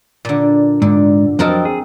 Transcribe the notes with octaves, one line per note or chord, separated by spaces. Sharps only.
A#2 D3
G#2 D3
F2 F#3 C4 A#4 D#5 A5
G#4